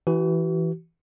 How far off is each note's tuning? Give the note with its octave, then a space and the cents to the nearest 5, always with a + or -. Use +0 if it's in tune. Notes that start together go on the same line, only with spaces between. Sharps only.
E3 +0 F#4 +40